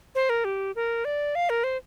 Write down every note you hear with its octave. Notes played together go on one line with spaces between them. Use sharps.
C5
A#4
G4
A#4
D5
F5
A#4
C5